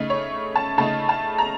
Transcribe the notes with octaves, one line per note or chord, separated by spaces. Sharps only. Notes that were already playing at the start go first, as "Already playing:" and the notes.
Already playing: C#3 A3 D#4
C#5
A5
C#3 A3 D#4 A5
A5
A#5